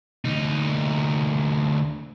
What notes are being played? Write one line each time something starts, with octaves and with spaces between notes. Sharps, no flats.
D2 D#4